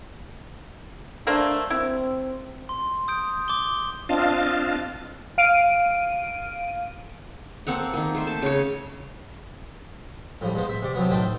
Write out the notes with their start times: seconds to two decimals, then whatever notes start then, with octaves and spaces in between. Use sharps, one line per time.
1.27 A3 A#3 D4 C5
1.70 C4 E4
2.69 C6
3.08 D#6 G6 D7
3.48 D6 G7
4.09 C4 D4 F4 D#5 F5 A5
5.38 F5 D7 D#7
7.67 A#3 C4 A4 F#5
7.94 D#3 A#3
8.14 A3 C5 E5
8.27 A5
8.42 C#3 C#5
10.41 A2 F3 G3
10.55 G#3 B3 C5
10.69 E5
10.82 C3 D5
10.95 C3 F3 F#3 B3
11.11 A2 D#4 A4 C5 G5